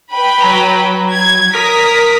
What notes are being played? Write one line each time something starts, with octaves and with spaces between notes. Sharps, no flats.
B4 G5 B5
F#3 A#5
G#6
A#4 A#5 D#6 B6